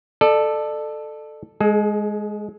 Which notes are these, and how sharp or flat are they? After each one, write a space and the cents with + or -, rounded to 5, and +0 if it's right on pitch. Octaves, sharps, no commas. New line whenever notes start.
A4 +0 D5 +35
G#3 +0 G#4 +45